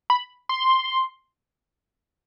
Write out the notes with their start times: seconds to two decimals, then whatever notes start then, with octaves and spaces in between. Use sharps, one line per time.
0.10 B5
0.49 C6